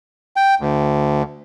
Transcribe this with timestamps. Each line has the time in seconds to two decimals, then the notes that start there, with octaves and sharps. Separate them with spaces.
0.37 G5
0.59 D2